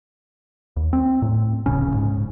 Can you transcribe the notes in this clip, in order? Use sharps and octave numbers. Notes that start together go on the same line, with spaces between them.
D#2
C4
A2
D1 A#1 C#3 C#4
G#2